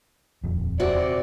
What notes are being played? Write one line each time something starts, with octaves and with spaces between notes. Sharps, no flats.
D#1 F2
C3 F#4 D5